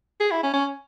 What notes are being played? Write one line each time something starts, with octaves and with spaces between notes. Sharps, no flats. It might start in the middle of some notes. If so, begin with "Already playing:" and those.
G#4
E4
C#4
C#4